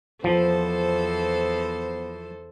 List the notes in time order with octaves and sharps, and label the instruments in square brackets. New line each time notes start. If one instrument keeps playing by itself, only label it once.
[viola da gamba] E2 A4 C5 [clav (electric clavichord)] F3 [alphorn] B3